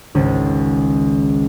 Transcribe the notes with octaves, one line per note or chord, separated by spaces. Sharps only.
G#1 C#2 C#4